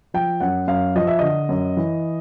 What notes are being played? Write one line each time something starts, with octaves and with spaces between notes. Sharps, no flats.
F3 G5
F#2 F#5
F#2 F5
F3 D#5
E5
D3 D#5
F#2
E3